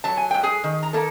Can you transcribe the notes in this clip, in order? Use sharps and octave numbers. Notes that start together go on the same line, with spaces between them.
F#3 A5
G#5
G#2 G5
G#4 G#5
D#3
A#5
A#3 A4 A5